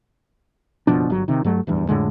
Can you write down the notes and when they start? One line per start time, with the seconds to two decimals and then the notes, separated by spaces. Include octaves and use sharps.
0.87 F#1 B2 F3 D4
1.10 G1 F#3
1.28 C3 D#3
1.44 G2 F#3 A3
1.67 D1 E2 G2
1.89 F2 A2 D3 G#3